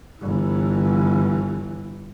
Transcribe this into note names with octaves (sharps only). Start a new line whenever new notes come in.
G1 E3